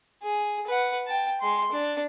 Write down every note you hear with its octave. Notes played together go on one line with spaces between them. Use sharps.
G#4
B4 F#5
G5 A5
G#3 C6
D4